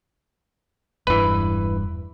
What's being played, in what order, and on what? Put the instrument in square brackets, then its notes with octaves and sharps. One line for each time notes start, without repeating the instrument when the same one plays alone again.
[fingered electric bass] E1 G2 [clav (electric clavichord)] E3 B4